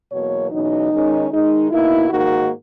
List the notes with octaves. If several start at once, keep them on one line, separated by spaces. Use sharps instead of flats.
E2 B2 F#3 A#3 C#5
E2 B2 F#3 C#4 D#4
D#3 G#3 C#4
D#3 G#3 D#4
B2 A#3 D#4 E4
G#2 D#3 A#3 D#4 F#4